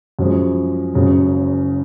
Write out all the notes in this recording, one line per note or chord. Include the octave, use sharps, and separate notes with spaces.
F#2 F3 G#3
F#1 F#2 C#3 G#3